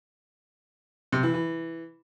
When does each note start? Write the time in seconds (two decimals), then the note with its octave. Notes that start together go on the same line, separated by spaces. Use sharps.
1.12 C3
1.23 E3
1.34 E3